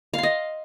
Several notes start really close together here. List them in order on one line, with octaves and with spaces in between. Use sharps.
F5 C6 D#5